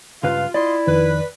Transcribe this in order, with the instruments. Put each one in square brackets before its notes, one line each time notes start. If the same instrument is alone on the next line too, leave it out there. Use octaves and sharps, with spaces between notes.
[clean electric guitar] C#2 G2 B4 [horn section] F4 [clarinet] F5
[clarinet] E4 [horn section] F4 D#5 C6 [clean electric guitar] D5
[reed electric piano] F2 D#3 [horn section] B4